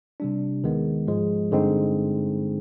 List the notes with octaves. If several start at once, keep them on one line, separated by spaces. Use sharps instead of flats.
C3 G3 D4
D#2 D#3 G#3 B3
G#2 F3 G#3
G2 D3 G#3 C4 D#4